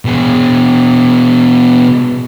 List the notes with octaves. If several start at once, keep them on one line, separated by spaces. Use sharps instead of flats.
B2 G#4